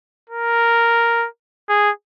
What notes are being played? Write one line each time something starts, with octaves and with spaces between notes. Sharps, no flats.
A#4
G#4